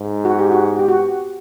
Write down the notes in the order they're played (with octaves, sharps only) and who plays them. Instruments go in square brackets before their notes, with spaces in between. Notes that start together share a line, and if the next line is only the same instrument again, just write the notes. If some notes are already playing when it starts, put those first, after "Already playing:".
Already playing: [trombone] G#2
[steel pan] F#4
G4
F#4
G4
F#4